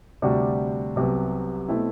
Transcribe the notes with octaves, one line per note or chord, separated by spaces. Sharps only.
D2 C3 G3 D4 F#4
C2 C3 F#3 B3
B2 A3 C4 E4